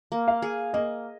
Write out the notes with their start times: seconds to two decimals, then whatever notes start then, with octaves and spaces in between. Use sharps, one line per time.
0.12 A#3
0.28 F5
0.42 G#4
0.74 A#3 D#5